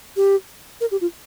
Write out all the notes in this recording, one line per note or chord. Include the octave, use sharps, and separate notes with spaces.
G4
A#4
G4
F4